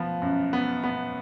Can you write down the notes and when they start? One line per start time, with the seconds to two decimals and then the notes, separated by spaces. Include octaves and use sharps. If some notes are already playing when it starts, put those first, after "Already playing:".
Already playing: F3 B3
0.22 F#2
0.53 B3
0.84 B3